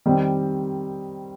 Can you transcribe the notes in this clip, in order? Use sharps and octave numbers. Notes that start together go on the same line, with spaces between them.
D#3 G3 C4